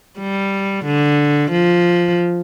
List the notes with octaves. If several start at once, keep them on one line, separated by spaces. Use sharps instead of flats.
G3
D3
F3